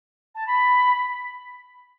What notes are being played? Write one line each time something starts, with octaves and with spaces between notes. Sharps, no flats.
A5
B5